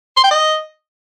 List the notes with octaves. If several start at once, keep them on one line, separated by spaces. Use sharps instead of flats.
C6
G5
D#5